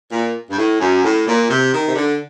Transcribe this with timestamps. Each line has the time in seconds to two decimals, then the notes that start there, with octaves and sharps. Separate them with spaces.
0.12 A#2
0.50 G2
0.58 A2
0.80 F#2
1.04 A2
1.27 A#2
1.50 C3
1.73 D#3
1.88 C3
1.96 D3